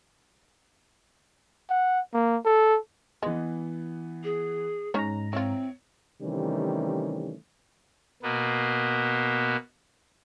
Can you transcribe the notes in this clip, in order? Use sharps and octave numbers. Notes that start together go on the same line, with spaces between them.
F#5
A#3
A4
E3 G#3 B3
G#4
G#2 C#4 D#4 C#5 A#5
C4 E4 F4 C#5
C3 D#3 E3 G3 A3 C#4
B2 A#3 B3